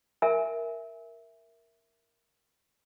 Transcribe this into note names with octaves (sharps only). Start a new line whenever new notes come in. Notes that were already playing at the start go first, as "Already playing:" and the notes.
A#4 E5 G#5